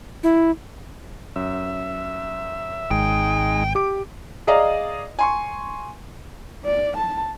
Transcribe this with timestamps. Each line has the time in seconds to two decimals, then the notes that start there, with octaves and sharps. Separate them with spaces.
0.23 E4
1.36 F#2 E5
2.91 G#1 G#3 D#4 G5
3.75 G4 D6 D7
4.47 G#4 D5 D#5 F5 A#5
5.19 G#5 C6 C#6
6.65 D5
6.97 A5